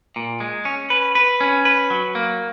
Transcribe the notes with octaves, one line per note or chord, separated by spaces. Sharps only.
A#2
G#3
C#4
B4
B4
C#4
B4
F#3
A#3